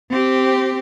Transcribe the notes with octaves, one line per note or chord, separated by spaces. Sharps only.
C4 G4